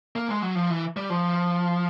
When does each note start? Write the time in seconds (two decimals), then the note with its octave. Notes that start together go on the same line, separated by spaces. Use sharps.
0.16 A#3
0.28 G#3
0.42 F#3
0.55 F3
0.70 E3
0.97 G3
1.10 F3